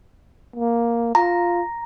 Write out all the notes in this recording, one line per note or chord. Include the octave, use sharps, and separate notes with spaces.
A#3
F4 A#5